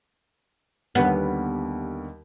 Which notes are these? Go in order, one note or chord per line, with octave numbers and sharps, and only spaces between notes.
D#2 D3 G3 B3